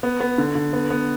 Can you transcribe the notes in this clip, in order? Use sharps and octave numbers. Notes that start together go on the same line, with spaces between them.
B3
B3
D3
D3
B3
B3